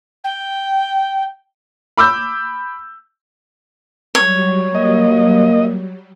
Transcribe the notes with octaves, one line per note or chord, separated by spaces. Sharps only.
G5
B5 D6 E6 G6
F#3 G3 C#5
A#3 D#5